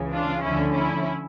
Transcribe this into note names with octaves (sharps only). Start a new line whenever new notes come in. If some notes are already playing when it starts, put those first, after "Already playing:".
Already playing: C#2 C#3 E3
D4 F4
D2 D3 F3 C#4 E4
C#4 E4